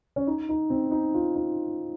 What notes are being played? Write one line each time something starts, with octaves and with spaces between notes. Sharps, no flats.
C#4
D#4
D#4
C4
D#4
F4
D#4